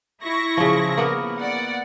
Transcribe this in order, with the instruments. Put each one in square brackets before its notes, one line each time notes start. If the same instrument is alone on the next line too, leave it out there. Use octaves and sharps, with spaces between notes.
[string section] E4 C#6 A#6
[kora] C#3 F3
A#3 B3 A#4
[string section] D5 F#5